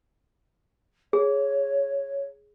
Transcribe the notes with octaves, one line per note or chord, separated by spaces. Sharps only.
G#4 C#5